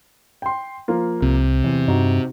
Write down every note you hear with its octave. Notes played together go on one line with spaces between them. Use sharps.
G5 C6
F3 A#3 F4
C2 C3
E2
G2 D#4 F#4